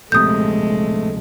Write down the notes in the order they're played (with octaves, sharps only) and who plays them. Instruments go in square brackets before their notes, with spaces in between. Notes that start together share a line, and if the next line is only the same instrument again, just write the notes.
[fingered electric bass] D1 A#1 C3 [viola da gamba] G#3 [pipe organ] A3 [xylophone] D#6 G6